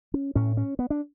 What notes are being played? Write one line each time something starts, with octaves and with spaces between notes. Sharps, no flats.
C#4
A2 C#4
C#4
B3
D4